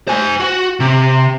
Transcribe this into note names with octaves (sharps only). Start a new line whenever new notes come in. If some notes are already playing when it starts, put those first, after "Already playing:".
C5 G#5
F#4
C3